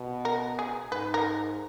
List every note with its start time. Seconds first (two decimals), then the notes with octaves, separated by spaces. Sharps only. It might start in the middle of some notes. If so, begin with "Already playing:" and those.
Already playing: B2
0.25 A#4
0.59 G#4
0.92 G#2 B4
1.14 A#4